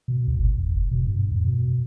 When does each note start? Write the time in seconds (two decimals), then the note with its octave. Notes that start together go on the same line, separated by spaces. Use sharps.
0.08 B2
0.27 D2
0.39 G1
0.58 F2
0.76 F#1
0.91 B2
1.07 G2
1.32 F2
1.44 B2